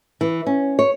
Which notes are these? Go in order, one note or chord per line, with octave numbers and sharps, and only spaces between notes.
E3
C#4
C#5